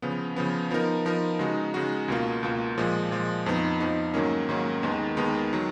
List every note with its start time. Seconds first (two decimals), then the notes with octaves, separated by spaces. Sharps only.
0.02 C#3 F3 B3
0.36 C#3 F3 B3
0.71 F3 B3 D#4 A#4
1.05 F3 B3 D#4 A#4
1.39 C#3 G#3 D#4 F#4
1.74 C#3 G#3 D#4 F#4
2.08 C#2 B2 A#3 F4
2.43 C#2 B2 A#3 F4
2.78 A#2 F3 G#3
3.11 A#2 F3 G#3
3.46 F2 F3 B3 D#4
3.80 F2 F3 B3 D#4
4.14 G#2 D#3 F#3 A#3 C#4
4.49 G#2 D#3 F#3 A#3 C#4
4.83 D#2 D#3 G#3 B3 D#4
5.17 D#2 D#3 G#3 B3 D#4
5.53 D#3 F#3